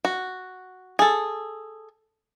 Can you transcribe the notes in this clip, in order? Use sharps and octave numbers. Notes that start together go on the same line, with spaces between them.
F#4
G#4 A4